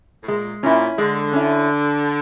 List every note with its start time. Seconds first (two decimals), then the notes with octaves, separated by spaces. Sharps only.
0.24 A2
0.28 A#2 G#3
0.63 A#2 C#4 E4
0.98 D3 G#3
1.33 C#4 E4